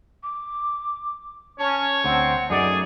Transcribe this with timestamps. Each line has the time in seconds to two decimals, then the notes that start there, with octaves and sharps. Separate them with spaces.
0.23 D6
1.59 C#4 C#5 A5
2.04 D2 C4 F#5 G5
2.50 F#2 A3 D#4 G#4 D5